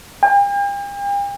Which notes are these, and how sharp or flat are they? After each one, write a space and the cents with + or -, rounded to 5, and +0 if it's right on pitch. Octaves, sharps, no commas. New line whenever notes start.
G5 +45